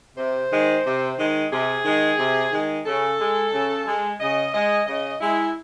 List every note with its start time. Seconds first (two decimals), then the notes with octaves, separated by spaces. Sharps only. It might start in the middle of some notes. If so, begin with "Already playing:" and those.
0.16 C3 C5
0.51 D#3 G#3
0.85 C3
1.18 D#3 G#3
1.51 C3 G#4
1.85 D#3 G#3
2.18 C3
2.52 D#3 G#3
2.86 C#3 A4
3.19 G#3
3.53 C#3
3.86 G#3
4.20 C#3 D#5
4.53 G#3 D#5
4.86 C#3 D#5
5.20 G#3 E4